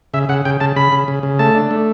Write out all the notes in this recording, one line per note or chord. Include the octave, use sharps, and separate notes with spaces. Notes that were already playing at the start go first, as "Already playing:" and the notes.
C#3 E5
C#3 F#5
C#3 G5
C#3 A5
C#3 B5
C#3
C#3
C#3
A3 A5
D4
A3